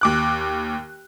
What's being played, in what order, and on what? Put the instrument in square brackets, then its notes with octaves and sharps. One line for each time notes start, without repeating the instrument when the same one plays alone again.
[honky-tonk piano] D#2 D6 F#6